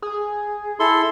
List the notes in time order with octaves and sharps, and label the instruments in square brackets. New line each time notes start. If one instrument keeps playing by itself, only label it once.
[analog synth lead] G#4
[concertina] E4 A4 C6